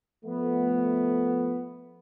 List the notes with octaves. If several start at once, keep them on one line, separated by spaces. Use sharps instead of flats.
F3 A3 B3